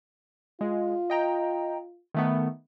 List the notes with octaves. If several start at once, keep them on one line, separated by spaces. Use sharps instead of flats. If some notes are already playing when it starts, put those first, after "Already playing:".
G#3 F4
D#5 G5 A#5
D#3 A3 B3